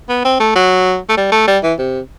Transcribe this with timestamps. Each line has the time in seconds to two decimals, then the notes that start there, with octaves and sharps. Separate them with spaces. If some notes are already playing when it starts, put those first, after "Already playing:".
0.09 B3
0.25 C4
0.40 A3
0.55 F#3
1.09 A3
1.17 G3
1.32 A3
1.47 G3
1.63 E3
1.79 C3